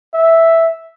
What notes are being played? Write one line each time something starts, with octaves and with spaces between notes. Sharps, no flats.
E5